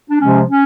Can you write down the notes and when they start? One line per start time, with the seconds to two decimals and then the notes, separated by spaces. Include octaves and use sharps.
0.09 D4
0.20 C3 F3 G#3 C#4
0.48 C#4